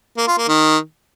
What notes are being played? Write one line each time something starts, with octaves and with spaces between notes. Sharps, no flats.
A#3
F4
A#3
D#3